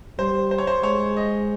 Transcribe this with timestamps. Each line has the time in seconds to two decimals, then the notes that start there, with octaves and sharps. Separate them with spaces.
0.19 G3 C5
0.51 C5
0.58 C#5
0.67 C5
0.83 G#3 C#5
1.17 D#5